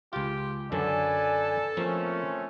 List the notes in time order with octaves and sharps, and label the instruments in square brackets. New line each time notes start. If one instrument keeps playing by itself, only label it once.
[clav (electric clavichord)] C#2 F4 [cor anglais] G4
[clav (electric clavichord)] F#2 D3 F#3 [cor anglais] A4 [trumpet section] B4 D5 G#5
[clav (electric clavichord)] F3 A#3 [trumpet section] A3 C4 C#4